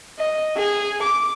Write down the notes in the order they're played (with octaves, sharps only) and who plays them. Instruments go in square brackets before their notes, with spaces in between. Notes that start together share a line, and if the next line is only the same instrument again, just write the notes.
[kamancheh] D#5
G#4
D6